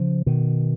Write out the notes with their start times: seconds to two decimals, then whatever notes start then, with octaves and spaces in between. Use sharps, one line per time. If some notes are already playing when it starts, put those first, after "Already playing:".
Already playing: C#3 F3
0.26 B2 D#3